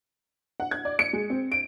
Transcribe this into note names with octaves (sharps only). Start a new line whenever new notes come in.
F#5
G#6
D5
C#7
G#3
C4
D7